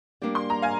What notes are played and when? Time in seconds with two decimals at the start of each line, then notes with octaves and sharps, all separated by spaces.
0.22 G3 A#3 D4 G4 D5
0.35 C6
0.50 A#5
0.62 F5 G#5